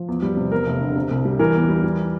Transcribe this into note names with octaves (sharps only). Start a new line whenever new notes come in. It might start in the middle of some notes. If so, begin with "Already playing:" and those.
Already playing: F3
E2
G3
C3
E2 A#4
F1
D3
C3
C2
G3
E3 A#4
E2
G3
E3